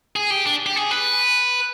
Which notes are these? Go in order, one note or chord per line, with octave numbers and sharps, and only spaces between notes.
G#4
G4
D4
G4
G#4
B4